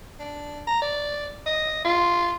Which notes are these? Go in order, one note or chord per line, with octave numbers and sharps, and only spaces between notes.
D4
A#5
D5
D#5
F4